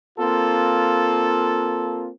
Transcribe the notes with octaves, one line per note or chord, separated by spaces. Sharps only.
A#3 C4 F4 A4